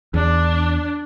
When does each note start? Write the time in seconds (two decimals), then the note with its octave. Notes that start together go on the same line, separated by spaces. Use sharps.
0.14 E2 D4